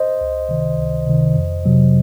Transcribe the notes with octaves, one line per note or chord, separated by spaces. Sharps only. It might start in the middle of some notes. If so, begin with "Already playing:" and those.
Already playing: C5 D#5
C#2
C3 D#3
C#2
C3 D#3
F2
C3 F#3